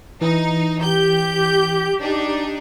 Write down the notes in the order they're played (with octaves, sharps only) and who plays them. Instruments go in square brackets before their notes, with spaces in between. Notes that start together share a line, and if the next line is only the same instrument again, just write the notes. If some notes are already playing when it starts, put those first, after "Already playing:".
[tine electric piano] E3 [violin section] D#4
[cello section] G4 [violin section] G6
[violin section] D4 D#4